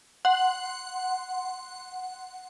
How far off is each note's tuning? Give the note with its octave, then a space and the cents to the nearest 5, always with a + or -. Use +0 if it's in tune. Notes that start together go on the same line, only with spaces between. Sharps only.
F#5 +0 C6 +0